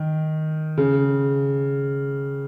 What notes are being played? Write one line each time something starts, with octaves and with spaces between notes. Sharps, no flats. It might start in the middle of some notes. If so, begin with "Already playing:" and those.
Already playing: D#3
C#3